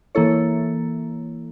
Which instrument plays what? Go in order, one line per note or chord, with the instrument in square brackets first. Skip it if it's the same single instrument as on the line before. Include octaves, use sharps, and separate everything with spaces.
[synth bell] E3 A#3 E4 A4 C#5